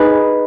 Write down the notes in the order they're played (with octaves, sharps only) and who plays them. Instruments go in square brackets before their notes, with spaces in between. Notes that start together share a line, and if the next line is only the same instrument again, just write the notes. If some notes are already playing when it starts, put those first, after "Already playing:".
Already playing: [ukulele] D#4 G#4 B4